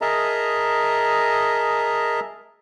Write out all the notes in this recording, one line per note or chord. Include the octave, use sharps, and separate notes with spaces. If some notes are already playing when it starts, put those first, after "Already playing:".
G#4 A#4 D#5 E5 A5 A#5